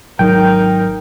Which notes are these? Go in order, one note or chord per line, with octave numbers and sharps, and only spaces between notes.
G#1 F#3 D#4 A#4 G5